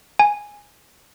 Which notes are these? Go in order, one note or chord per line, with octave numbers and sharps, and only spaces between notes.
G#5